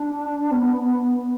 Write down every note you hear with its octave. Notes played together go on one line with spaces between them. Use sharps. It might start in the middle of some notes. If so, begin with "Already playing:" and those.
Already playing: D4
B3